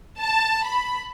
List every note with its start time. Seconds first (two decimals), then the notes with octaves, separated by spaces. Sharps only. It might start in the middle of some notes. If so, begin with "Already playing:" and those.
0.19 A5
0.66 B5